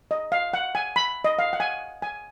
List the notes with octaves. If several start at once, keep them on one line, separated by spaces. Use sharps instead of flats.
D#5
F5
F#5
G#5
B5
D#5
F5
F#5
G#5
G#5